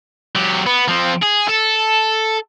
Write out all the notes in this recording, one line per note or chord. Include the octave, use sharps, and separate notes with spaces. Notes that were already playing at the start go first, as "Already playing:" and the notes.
F#3 G4
B3
F3 C4
G#4
A4